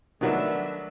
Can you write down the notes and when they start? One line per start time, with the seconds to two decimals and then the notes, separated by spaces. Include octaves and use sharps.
0.21 D#3 F#3 A3 B3 D4 E5